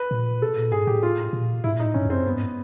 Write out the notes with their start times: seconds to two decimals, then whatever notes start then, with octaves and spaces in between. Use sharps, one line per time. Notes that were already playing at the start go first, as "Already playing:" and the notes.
Already playing: B4
0.11 A#2
0.41 B2 A4
0.57 A#2
0.72 G#2 G#4
0.87 A2 G4
1.03 F4
1.33 A#2
1.64 G#2 E4
1.74 A#2
1.80 D#4
1.84 A2
1.94 G2 C#4
2.05 F2
2.10 C4
2.15 F#2
2.25 G2 B3
2.36 G#2